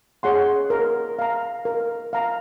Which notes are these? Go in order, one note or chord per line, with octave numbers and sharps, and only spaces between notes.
G#4 C#5 F#5 C6
A#4
F5 A#5
A#4
F5 A#5